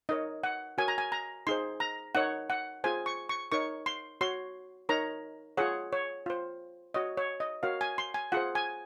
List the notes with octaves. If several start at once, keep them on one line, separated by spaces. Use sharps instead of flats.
D#4 A#4 C#5 D#5
F#5
F#4 A#4 C#5 G#5
A#5
G#5
A#5
D#4 G#4 C5 C6
A#5
D#4 A#4 C#5 F#5
F#5
F4 G#4 C5 G#5
C#6
C#6
D#4 A#4 C#5 C#6
C6
F#4 C#5 C6
D#4 A#4 C#5 A#5
F4 G#4 C#5 F#5
C#5
F4 C5
F#4 C#5 D#5
C#5
D#5
F#4 A#4 C#5 F5
G#5
C6
G#5
F4 G#4 C5 F#5
G#5